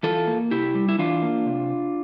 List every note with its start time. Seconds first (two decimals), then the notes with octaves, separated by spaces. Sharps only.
0.03 E3 F4 A4
0.27 A#3
0.51 C3 E4 G4
0.75 G3
0.89 E4
0.98 E3 D4 F4
1.22 A#3
1.46 C3